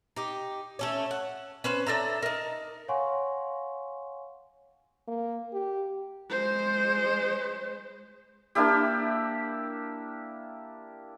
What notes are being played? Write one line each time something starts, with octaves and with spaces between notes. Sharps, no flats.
D#4 G4
A3 C#4 C#5
F#5
C#4 B4 C5
D4 A4 E5 A#5
D#4 A#4
C#5 F5 F#5 G#5 C6 C#6
A#3
G4
G#3 C5
A#3 D4 E4 G4